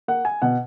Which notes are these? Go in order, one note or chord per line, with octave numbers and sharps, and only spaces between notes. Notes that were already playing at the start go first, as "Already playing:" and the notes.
A#3 F#5
G#5
B2 F#5